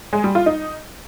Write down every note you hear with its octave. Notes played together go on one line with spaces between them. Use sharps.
G#3
G3
F4
D#4